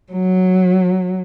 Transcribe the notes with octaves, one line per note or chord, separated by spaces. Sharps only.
F#3